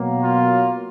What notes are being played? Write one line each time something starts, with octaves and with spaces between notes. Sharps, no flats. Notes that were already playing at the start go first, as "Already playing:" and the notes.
Already playing: B2 F#3 A#3
F4